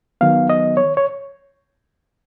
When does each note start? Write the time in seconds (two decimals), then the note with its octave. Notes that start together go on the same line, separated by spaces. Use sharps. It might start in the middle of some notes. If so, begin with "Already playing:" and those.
0.21 D#3 F#3 B3 F5
0.50 D#5
0.77 C#5
0.97 C#5